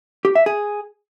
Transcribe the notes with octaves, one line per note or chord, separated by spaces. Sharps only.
G4
E5
G#4